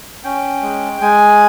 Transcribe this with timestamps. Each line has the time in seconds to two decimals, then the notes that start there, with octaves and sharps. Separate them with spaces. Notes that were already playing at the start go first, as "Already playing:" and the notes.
0.24 C#4 G5
0.62 G#3
1.01 G#3 G#5